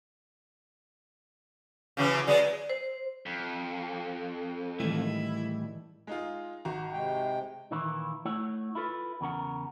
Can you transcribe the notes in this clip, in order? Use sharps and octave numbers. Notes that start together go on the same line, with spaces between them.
C#3 E3 F#3
F#3 G#3 B3 D5
C5
F2
A2 D#3 E3 G3 G#3 E4
G#3 D#4 F4
G#1 F#4 A#5
C3 G#3 G5
A#2 D#3 E3 A#3 E4
A3 E4 C#5 F#5
E4 F4 A4 B4
E2 C#3 A#4 F#5